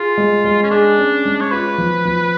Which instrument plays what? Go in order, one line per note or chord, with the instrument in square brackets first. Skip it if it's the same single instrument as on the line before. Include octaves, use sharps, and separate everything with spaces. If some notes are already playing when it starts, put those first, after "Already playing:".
Already playing: [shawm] F4 [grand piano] G#4
[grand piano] G#3
G#3
[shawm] C#4
[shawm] D4 [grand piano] G#4
[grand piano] C#4
G#3
[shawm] C#5
[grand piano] F4 [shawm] B4
[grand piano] F3
F3